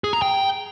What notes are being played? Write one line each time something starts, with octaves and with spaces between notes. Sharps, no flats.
G#4
A#5
G5